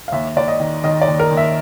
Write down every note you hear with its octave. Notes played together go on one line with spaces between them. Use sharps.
F5
D#2 E5
D#2 D5
D#5
D#3
D#3 D#5
D5
D#2
A#4
D#2
E5